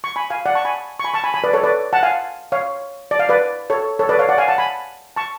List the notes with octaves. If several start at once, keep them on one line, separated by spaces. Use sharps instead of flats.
C#6
G#5 B5
F5 G#5
D5 F#5
A5 C#6
G#5 B5
C#6
G#5 B5
A5 C#6
G#5 B5
G#5 B5
B4 D5
A4 C#5
B4 D5
F#5 A5
F5 G#5
C#5 F5
D5
F5
B4 D5
A4 C#5
A4 C#5
B4 D5
C#5 F5
D5 F#5
F5 G#5
F#5 A5
G#5 B5
A5 C#6